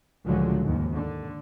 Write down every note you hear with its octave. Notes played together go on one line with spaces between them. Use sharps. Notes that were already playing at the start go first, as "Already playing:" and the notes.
C#2 A2 D3 F3 F#3 G#3
D#2 G#2
D3